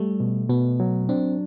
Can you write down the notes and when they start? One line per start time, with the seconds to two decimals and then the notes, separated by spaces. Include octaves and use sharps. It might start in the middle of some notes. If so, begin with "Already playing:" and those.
Already playing: G3 A3
0.20 B2
0.49 B2 B3
0.80 F#3
1.09 C4 D4